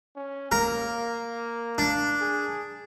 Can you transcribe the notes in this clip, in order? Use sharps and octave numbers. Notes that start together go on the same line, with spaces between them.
C#4
A#3 A#4
D4
G#4